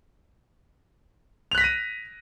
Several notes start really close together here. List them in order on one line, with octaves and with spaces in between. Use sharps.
F7 F#6 B6 A#6 D#7